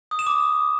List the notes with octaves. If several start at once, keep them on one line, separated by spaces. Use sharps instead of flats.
D#6
E7
D6